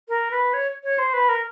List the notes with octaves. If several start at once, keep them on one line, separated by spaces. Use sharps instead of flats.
A#4
B4
C#5
C#5
C5
B4
A#4